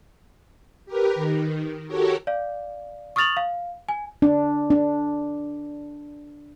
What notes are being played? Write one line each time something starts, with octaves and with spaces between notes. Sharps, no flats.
G4 A#4 B4
D#3
F#4 G4 A4 A#4 C#5
D5 F5
C#6 D#6 F6 A6 F7 F#7
F5
G#5
D4
D4